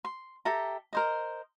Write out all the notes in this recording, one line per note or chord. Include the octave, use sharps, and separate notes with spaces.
C6
G4 A4 E5 A#5
A#4 C5 D#5